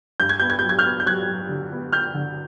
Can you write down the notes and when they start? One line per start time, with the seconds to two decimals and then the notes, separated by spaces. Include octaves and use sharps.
0.20 G2 G6
0.29 G#6
0.40 B3 G6
0.50 G#6
0.59 F#3 G6
0.69 G#6
0.79 F6 G6
0.85 B3
1.00 G6
1.06 F#3 F#6 G#6
1.28 F#3
1.49 D3
1.72 B3
1.93 B3 F6 G6
2.14 D3